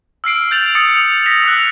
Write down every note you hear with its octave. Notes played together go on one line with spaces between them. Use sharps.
E6 F6 C7 D7
G6 A6 F7 F#7
D#6 A6 C#7 F7
A#6 B6 F7
D#6 E6 F#6